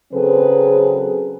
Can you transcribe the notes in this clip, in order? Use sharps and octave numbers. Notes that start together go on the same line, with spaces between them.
C#3 F#3 C4 G#4 A4 B4